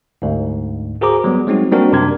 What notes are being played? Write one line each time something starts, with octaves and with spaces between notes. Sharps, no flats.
D2 G#2
F#4 G#4 A#4 C5 A#5 D6
F#3 G3 B3
F#3 G#3 C4 D#4 F#4
G3 A#3 C4 D4 F#4 A#4
F#2 C3 D4 A#4 G#6